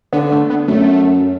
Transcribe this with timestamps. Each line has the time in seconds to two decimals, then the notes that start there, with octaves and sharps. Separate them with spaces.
0.13 D3 B3
0.32 A3
0.50 B3
0.68 F#2 A3